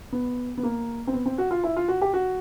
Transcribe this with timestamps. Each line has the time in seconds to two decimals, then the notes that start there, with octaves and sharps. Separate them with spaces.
0.12 B3
0.57 B3
0.63 A#3
1.07 C4
1.13 B3
1.26 C4
1.38 F#4
1.51 F4
1.64 E4
1.77 F4
1.88 F#4
2.01 G4
2.14 F#4